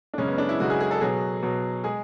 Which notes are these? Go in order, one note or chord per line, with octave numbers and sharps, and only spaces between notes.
D4
F#2 C#3 G#3 C#4
B3
D4
E4
F#2 C#3 G#3 F#4
G#4
G#4
A4
B2 F#3 G#4
B2 F#3
G#3 G#4